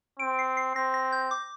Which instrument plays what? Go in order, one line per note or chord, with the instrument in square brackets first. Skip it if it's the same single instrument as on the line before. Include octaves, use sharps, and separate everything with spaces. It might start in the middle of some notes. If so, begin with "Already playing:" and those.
[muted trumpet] C4 [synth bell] D7
[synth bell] C7
C7
[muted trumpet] C4 [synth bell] A#6
[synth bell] A#6
G6
D6